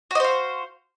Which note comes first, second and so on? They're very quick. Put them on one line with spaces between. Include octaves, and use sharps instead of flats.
F#4 D#5 C5 F5